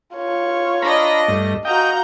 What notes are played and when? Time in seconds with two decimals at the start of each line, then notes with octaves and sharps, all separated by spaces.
0.15 F4 C#5
0.82 D4 D#5 A#5 B5 A#6
1.28 G2 A3
1.65 F#4 D#5 F5 G5 A#5 G6